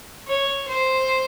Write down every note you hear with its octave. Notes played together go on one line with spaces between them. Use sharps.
C#5
C5